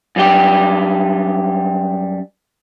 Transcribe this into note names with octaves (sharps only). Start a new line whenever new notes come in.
F#2 G3 G4